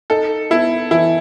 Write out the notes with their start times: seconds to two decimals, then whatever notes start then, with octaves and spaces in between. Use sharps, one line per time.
0.10 D#4 A4
0.50 B3 E4
0.91 E3 E4